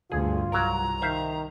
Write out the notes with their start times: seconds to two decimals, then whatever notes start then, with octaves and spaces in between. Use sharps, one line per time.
0.12 D2 G2 F4 G#4
0.52 C2 F#3 A#4 A#5
1.02 D#3 C5 E5 F5